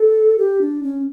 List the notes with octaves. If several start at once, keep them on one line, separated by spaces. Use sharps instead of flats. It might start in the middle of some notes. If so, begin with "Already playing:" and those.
Already playing: A4
G4
D4
C#4